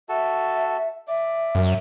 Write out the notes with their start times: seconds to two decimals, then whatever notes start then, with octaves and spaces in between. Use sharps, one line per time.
0.09 F#4 A4 E5 A5
1.08 D5 E5
1.55 F#2